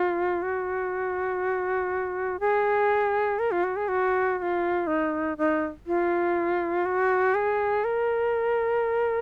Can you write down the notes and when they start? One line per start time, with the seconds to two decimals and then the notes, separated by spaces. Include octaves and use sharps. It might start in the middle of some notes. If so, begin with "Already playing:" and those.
Already playing: F4
0.42 F#4
2.40 G#4
3.39 A#4
3.51 F4
3.64 F#4
3.76 G#4
3.88 F#4
4.38 F#4
4.42 F4
4.87 D#4
5.38 D#4
5.87 F4
6.85 F#4
7.34 G#4
7.84 A#4